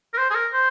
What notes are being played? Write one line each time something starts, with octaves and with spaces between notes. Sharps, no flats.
A#4
C5
G#4
A#4
C5